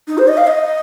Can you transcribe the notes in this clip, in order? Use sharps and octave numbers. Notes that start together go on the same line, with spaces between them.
D#4
C5
D#5
F5
D#5